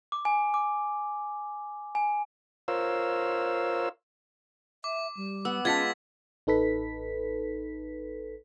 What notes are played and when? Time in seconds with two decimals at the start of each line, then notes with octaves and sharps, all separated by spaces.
0.12 D6
0.25 G#5
0.54 D6
1.95 G#5
2.68 F4 A#4 C5 C#5 F5 E6
4.84 E5 D6
5.17 G3
5.45 B3 E6
5.65 G#3 C#4 F4 F#5 A5 G#6 A6 B6
6.47 A1 D#4 A4 B4 B6